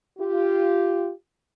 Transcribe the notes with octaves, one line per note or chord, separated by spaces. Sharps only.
F4 G4